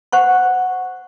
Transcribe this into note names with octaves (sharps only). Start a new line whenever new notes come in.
C5 F#5 C#6